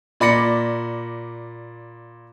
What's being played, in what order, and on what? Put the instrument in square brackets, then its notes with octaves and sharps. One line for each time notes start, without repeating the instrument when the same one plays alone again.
[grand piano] A#2 D5 B5 A#6 C#7